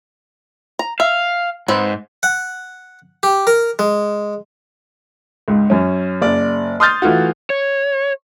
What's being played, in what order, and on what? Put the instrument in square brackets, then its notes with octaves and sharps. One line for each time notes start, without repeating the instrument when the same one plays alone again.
[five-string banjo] A#5
[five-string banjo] E5 [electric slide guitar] F5
[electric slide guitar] G#2 [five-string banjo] C4 B4
[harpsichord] F#5
G4
A#4
G#3
[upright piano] C#2 G#2
F#2 C#4
F#1 D5
C6 D#6 F6 G6 A6
E3 A3 F4 F#4
[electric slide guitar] C#5